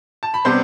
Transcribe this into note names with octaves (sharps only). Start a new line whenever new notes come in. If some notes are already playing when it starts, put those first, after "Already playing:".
A5
B5
C3 G3 B3 D4 C5 C6